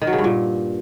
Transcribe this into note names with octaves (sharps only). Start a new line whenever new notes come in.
D#3
F#3
C#3
G2
A#2